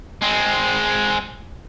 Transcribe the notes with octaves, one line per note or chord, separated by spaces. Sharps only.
G#3 C4